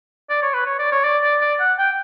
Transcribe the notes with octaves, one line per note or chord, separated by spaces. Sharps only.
D5
C#5
B4
C#5
D5
C#5
D5
D5
D5
F#5
G5